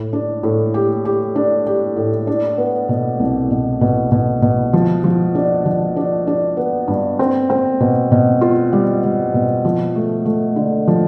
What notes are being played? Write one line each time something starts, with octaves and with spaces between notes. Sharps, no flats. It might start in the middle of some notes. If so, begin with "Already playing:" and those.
Already playing: A2
D4
A2
G4
G4
D4
G4
A2
D4
B3
B2
C2
B2
B2
B2
B2
F3
F3
D4
F3
D4
D4
B3
G2
C4
C4
B2
B2
F4
G3
G3
B2
F3
A3
A3
D3
F3